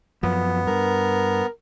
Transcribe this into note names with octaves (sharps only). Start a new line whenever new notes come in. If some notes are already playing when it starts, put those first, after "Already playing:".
F#2 F3 B3
G2 A#4